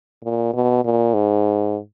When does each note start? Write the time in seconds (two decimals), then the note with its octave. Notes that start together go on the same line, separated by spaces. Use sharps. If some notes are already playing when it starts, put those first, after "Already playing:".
0.24 A#2
0.53 B2
0.85 A#2
1.14 G#2